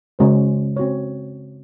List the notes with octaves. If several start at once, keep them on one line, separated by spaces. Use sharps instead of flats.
C#3 G#3 C#4 F#4 C5
C4 F#4 C#5